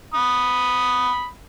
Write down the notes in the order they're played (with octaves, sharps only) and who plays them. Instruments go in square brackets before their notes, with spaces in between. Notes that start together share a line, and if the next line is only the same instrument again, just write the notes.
[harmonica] B5 D#6